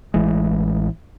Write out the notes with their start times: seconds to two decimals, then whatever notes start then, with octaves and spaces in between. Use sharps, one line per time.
0.14 A1 A2 E3 G#3